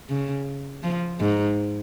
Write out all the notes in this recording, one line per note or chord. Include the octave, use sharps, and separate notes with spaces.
C#3
F3
G#2